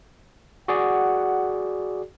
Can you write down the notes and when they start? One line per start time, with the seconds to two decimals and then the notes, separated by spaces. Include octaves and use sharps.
0.68 F#4 G#4 D5 F#5